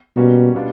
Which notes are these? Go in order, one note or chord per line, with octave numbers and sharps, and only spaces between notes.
B2 G3 A#3 C#4 F#4
B2 G3 B3 D4 F4